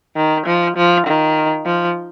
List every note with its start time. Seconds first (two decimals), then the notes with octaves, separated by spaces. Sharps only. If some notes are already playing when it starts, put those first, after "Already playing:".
0.16 D#3
0.46 F3
0.76 F3
1.06 D#3
1.66 F3